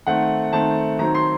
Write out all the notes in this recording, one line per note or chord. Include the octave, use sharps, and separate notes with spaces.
D#3 A3 C4 F#5
D#3 A3 C4 A5
D#3 F#3 C4 A#5
C6